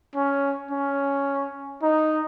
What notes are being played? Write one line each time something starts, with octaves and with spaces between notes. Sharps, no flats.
C#4
C#4
D#4